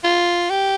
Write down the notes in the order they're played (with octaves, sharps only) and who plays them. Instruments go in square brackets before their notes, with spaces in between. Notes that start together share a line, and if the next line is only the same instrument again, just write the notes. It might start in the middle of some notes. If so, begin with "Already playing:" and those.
[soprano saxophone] F4
G4